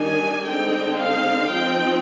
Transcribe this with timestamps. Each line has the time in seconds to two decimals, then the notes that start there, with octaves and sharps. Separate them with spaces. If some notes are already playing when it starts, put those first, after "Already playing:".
Already playing: D#3 G3 D4 G#5
0.46 D3 G#3 C4 D#4 G5
0.98 F5
1.51 F3 C4 D#4 G5